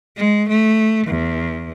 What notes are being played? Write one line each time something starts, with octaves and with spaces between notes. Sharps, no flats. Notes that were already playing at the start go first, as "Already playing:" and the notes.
G#3
A3
E2